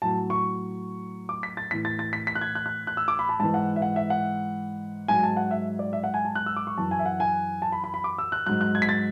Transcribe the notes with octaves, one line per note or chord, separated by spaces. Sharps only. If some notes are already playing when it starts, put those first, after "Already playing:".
A2 F#3 A5
C#6
D6
B6
A6
A2 E3 B6
A6
A6
B6
B6
F#6
G#6
F#6
F#6
F#6
E6
D6
B5
A5
G#2 E3 A5
F#5
E5
F#5
E5
F#5
G#2 F#3 G#5
A5
F#5
E5
D5
E5
F#5
G#5
A5
F#6
E6
D6
C#6
F#2 E3 A5
G#5
E5
F#5
G#5
A5
B5
B5
B5
D6
E6
F#6
G#2 F#3 F#6
F#6
G#6
B6
A6